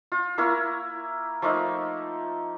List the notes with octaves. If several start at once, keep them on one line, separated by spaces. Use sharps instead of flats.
F4
A#3 E4 A#4 C#6
F3 A3 A#3 D#4